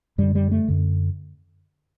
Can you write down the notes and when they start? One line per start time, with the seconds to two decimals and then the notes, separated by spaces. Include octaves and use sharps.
0.18 F#2 D3 G3
0.35 G3
0.51 A3
0.68 F#2 D3